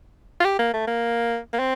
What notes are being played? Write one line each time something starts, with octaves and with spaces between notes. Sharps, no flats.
F4
G4
A#3
A3
A#3
A#3
C4